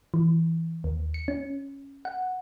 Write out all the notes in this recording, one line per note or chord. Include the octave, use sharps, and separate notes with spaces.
E3
D#2
C#7
C#4
F#5